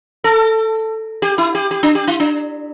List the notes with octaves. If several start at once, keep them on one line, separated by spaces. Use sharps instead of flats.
A4
G4
E4
G4
G4
D4
G4
E4
D4